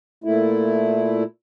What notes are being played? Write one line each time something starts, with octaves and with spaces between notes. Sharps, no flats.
A#2 A3 E4